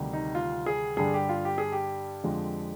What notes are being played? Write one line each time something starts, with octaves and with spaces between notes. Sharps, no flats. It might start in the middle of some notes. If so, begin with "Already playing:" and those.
Already playing: D2 C3 D#3 G3
D#4
F4
G#4
G2 D3 G3 G#4
G4
F4
G4
G#4
G4
F2 D3 F3 G#3